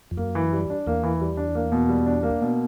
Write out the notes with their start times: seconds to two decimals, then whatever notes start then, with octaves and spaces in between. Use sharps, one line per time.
0.11 F2
0.17 F#2 A#3
0.35 E3
0.53 G3
0.70 D4
0.87 E2 A#3
1.03 E3
1.21 G3
1.37 D4
1.55 A#3
1.72 B2
1.89 G3
2.06 D4
2.23 A#3
2.41 B2